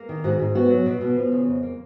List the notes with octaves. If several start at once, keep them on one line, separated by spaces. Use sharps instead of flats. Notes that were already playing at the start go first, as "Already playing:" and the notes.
Already playing: A#3
D#3
G#2 F#4
G#2
B3 F#4
F#3
B2
B2
F3
C#3
F2
A#3